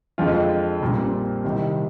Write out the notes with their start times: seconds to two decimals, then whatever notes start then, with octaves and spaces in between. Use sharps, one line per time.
0.18 F2 D3 G#3 F4
0.81 A#1 A#2 G3 A#3
0.97 C4
1.44 C2 C3 D#3 G3